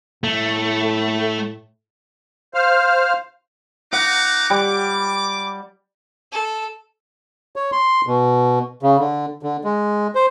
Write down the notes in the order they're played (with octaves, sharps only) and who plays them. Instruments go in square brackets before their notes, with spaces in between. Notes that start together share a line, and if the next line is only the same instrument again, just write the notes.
[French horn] A2 [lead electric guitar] A3
[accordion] C5 F5 F6
[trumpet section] D#4 A#4 D6 [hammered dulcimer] F#5
[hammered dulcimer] G3 [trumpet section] D6
[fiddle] A4
[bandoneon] C#5
C6
B2
C#3
D3
D3
G#3
C5